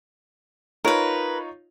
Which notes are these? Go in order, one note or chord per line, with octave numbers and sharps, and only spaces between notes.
D#4 F4 A#4 B4 C#5